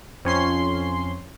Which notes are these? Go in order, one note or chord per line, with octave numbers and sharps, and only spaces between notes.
F2 C#4 C6